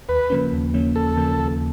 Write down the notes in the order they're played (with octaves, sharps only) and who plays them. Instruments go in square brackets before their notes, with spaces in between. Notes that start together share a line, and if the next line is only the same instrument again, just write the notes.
[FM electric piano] D#2 [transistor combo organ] B4
[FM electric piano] C#3 F3 A#3 C#4
D#2
C#3 F3 A#3 C#4
[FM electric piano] D#2 [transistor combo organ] A4
[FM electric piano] C#3 F3 A#3 C#4
D#2